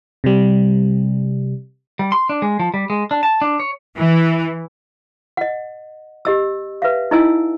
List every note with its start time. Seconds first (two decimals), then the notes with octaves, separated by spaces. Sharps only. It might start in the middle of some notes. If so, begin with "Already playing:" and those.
0.24 C3 G3
1.99 G3
2.12 C6
2.29 D4
2.42 G#3
2.59 F3
2.74 G3
2.90 G#3
3.11 D4
3.23 A5
3.42 D4
3.60 C#5
3.97 E3
5.37 D#5 F#5
6.25 G4 D#5 E6
6.82 B4 E5 F5
7.11 D#4 E4 D#5 G#5 E6